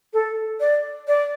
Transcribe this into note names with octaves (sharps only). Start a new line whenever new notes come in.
A4
D5
D5